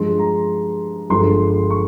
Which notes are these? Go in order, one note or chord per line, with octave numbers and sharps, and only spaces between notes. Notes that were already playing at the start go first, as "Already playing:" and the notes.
Already playing: G2 F3 G#3 C6
A#5
G1 G2 F3 G#3 C6
C#6